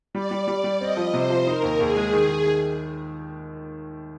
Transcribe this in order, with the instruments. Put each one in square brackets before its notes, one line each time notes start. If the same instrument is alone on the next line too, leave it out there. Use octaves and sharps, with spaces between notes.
[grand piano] G3 [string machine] D5
[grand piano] G3
G3
G3
[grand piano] C4 [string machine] D#5
[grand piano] F3
[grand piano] C3 [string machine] C5
[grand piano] F3
[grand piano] D#4 [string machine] A#4
[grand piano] D#2
[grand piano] D#2 [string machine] G#4
[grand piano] G#3
D#3
D#3
D#3